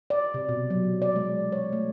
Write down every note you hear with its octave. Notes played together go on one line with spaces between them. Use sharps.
D5
C3
B2
F#3
D5
G#3
C#5
A3